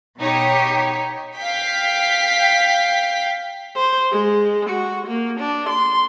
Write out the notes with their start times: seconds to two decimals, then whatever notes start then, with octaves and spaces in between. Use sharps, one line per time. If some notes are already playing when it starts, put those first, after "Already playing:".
0.19 B2 D#4 G4 C#5
1.37 F5 G5 B6
3.76 C5
4.12 G#3
4.70 F#4
5.08 A#3
5.40 D4
5.69 C6